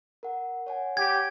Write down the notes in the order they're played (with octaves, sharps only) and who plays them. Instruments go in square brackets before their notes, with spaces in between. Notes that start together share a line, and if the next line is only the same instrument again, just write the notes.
[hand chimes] A#4 F#5
C#5 F#5 G#5
[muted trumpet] G4 [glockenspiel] G#6